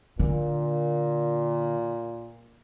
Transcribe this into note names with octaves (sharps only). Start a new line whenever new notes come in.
A#2 D3